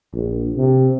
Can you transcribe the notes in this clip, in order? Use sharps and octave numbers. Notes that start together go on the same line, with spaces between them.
A#1
C3